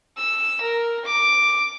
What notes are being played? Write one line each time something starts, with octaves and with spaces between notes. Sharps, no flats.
E6
A#4
D6